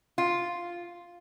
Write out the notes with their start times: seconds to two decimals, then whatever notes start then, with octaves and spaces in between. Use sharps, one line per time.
0.18 F4